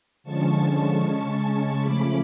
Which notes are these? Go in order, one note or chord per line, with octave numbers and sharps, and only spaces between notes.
D3 F3 G#3 C#4 A5 C#6
C#3 G#3 C#4
C#3 F3 A3 C#4 B5 D6